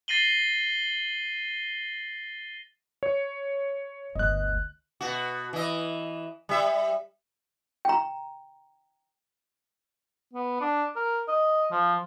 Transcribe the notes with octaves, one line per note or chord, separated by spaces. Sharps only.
A6 A#6 C7 D#7 F#7 G7
C#5
G1 D2 D#5 F#6
B2 F#4
E3 D#5
G3 E5
G5 A#5
B3
D4
A#4
D#5
F3